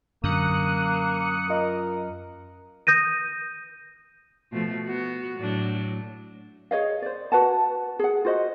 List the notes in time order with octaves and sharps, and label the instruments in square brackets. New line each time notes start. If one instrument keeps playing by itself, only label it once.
[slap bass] F#2 [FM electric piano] D3 [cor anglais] A#3 [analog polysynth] D#6 F#6 C#7
[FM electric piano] F4 D#5 [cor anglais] A#4
[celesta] D#6 G6 A#6 D#7
[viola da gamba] B2 F3 A3
B3 F#4
A2 F#3 D4
[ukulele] G#4 C#5 D#5 F5
C5 D5
F#4 B4 F#5 A5
G#4 F#5
F4 F#4 C5 D#5